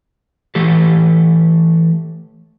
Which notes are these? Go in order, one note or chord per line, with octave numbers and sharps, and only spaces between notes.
E3 A3 G4 A4